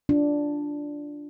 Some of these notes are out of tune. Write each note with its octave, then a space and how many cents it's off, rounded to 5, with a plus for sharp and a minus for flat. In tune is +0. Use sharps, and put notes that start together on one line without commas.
D4 -5 F4 +0